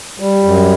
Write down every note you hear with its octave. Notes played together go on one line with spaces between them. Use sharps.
G3
F#2